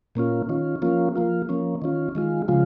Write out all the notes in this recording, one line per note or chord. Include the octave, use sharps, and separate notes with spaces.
A#2 A#3 C#4 F4
D#3 C#4 F4
F3 A#3 C#4 F4
F3 A#3 F4
F3 A#3 C#4
D#3 C#4 F4
D#3 G#3 F4
C#3 F3 G#3 F4